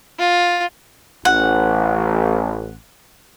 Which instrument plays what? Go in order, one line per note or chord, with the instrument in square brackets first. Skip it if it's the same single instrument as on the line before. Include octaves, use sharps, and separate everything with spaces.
[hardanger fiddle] F4
[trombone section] A1 [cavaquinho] F#5